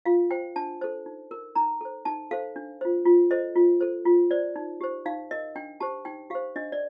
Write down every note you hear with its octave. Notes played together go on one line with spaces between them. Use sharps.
F4 F5
C5 G5
D4 A5
A4 C5
D#4
A#4
D#4 A#5
A4 C5
D#4 A5
A4 C5 F5
D4
F4 C5
F4
A4 C5 D#5
F4
A4 C5
F4
C5 D5
D#4
G4 C5
D#4 F5
A#4 D#5
D4 G5
G4 C5 A5
D#4 G5
G4 C5 F5
D4 D#5
D5